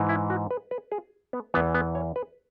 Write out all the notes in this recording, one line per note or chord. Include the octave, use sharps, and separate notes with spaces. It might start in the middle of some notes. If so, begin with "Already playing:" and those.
Already playing: G#2 E3
E4
F#4
B4
B4
G#4
B3
E2 E3 B3
B3
C#5
B4